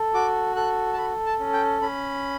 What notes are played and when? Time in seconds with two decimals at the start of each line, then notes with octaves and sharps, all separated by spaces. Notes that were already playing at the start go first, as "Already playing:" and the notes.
Already playing: A4
0.14 F#4 D6
0.56 A4 F#6
0.93 A5
0.97 A4 B5
1.26 A5
1.40 C#4
1.53 G5
1.82 C#4 B5